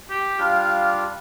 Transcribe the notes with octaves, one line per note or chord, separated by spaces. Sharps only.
G4
G3 D4 F4 F5